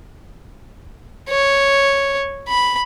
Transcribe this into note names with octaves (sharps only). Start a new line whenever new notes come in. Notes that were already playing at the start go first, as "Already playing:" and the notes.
C#5
B5